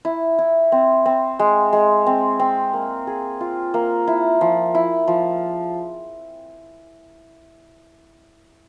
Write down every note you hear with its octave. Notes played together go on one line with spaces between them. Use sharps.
E4
E4
C4
C4
G#3
G#3
C4
C4
A#3
G#4
F4
A#3
E4
F3
E4
F3